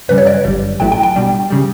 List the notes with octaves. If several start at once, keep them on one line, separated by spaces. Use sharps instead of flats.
F#2 C#3 G3 C#4 B4
C#5
D5
G1 F#2 D3 G3
A1 A2 F#3 A3 E4 G5
G5
G5
B2 G3 D4
C#3 G3